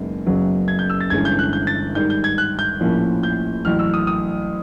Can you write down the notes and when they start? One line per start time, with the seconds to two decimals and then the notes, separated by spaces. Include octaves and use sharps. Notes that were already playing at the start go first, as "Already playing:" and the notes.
Already playing: F#1 F#2 D#3 G#3 B3
0.26 F#1 F#2 C#3 F#3 B3
0.68 G#6
0.79 G6
0.90 E6
1.01 A6
1.10 G1 G2 E3 G#3 C#4 G#6
1.25 G6
1.39 F#6
1.53 G6
1.67 A6
1.95 G#2 D#3 G3 G6
2.10 G6
2.24 G#6
2.38 F#6
2.59 G6
2.80 A#1 A2 F3 A#3 C#4
3.23 G6
3.65 A1 A2 F#3 F6
3.79 E6
3.94 D#6
4.07 D#6